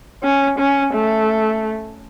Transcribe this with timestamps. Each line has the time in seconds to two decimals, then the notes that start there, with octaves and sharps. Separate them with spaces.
0.23 C#4
0.58 C#4
0.94 A3